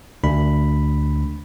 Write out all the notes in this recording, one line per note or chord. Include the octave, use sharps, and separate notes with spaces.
D2 D4 B5